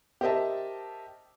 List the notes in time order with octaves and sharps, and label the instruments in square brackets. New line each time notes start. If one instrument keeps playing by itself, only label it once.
[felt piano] G4 A#4 C5 D#5 E5 A5